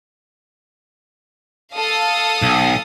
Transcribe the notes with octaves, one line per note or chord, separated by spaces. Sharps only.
A4 F5 D#6
B1